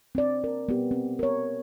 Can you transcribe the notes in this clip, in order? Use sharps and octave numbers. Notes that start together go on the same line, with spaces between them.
C4 D5
A#4
B3 G4
C4
A#4 C#5